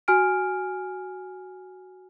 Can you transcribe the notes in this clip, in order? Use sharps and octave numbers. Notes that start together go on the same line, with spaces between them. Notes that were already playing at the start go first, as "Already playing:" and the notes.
F#4 G#5 F6 D7